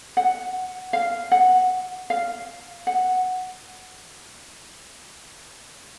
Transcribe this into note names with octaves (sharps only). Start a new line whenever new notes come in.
F#5
F5
F#5
F5
F#5